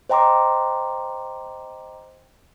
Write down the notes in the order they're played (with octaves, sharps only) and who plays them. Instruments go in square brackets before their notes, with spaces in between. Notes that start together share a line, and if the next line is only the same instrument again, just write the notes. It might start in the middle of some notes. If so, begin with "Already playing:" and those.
[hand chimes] C5 D#5 G5 A#5 C6 D6